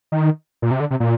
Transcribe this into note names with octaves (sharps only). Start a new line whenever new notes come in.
D#3
A#2
C3
D3
C3
A#2